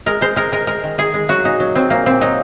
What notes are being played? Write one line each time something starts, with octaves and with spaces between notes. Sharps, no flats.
G#3 A#4
G#3 C5
G#3 A#4
G#3 A#4
G#3 A#4
D#3
D#3 G#4
G#3
F#3 F#4
A#2 D#4
F#3
F#3 C4
A#2 A#3
A#2 C4
F#3 D#4